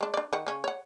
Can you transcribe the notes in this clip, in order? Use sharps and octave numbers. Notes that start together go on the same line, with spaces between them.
G#3 D4
D4 D5
D#3 F#5
C#3 C#4
C#5 F#5